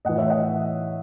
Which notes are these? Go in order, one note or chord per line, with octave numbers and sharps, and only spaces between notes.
A2 E3 D#5 F#5
C#5 E5
D#5 F#5